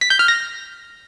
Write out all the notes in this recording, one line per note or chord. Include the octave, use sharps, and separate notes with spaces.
B6
G6
F6
A#6